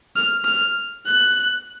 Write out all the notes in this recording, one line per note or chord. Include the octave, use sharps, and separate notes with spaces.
F6
F6
F#6